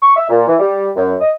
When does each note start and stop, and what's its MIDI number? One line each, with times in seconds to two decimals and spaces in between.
0.02 0.16 85
0.16 0.27 76
0.30 0.44 46
0.47 0.55 52
0.59 0.89 55
0.95 1.14 42
1.21 1.32 75